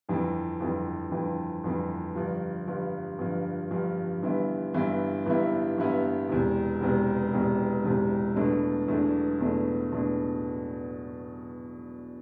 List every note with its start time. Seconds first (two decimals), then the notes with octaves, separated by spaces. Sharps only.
0.09 G1 F2 E3
0.60 G1 F2 E3
1.12 G1 F2 E3
1.64 G1 F2 E3
2.15 G1 G2 F3
2.67 G1 G2 F3
3.19 G1 G2 F3
3.70 G1 G2 F3
4.22 G1 G2 E3 B3 E4
4.74 G1 G2 E3 B3 E4
5.26 G1 G2 E3 B3 E4
5.78 G1 G2 E3 B3 E4
6.29 E1 E2 C3
6.81 E1 E2 C3
7.33 E1 E2 C3
7.85 E1 E2 C3
8.36 E2 B2 A3 D4
8.88 E2 B2 A3 D4
9.40 E2 B2 A3 D4
9.92 E2 B2 A3 D4